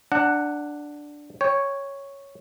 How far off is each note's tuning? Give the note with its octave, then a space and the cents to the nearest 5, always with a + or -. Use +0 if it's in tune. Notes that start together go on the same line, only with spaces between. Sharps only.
D4 +0 F#5 +0 A#5 -40
C#5 +0 G5 +25